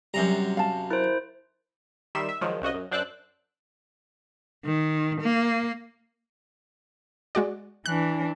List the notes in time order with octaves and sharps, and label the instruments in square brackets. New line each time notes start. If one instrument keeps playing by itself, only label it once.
[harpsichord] F#2 C3 A#5 [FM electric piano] G3
[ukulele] F5 A5
[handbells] E4 C5 [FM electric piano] A#4
[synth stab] D#3 G3 E5 C6 E7
E5
D#3 F3 F#3 G#3
C2 C#3 F#4 D#5
F#2
F#2 D4 C5 D6 E6 F#6
[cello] D#3
A#3
[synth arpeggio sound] G#3 F#4 D5
[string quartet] E3 D4 [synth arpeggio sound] F#6